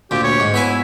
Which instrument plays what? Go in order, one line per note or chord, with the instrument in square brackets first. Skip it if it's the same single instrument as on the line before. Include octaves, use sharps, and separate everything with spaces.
[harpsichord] D2 A#2 [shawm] G4
[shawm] C#5
[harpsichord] G#2
[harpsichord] B3 B4 G#5 [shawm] E4